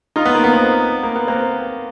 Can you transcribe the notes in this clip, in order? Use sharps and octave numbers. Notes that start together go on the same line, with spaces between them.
D#4 F4
B3
A#3
B3
A#3 C4
A#3
B3
A#3 C4